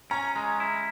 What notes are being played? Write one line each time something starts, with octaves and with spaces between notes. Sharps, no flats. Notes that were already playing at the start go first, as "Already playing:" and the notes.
C#4 A#5
G#3
E4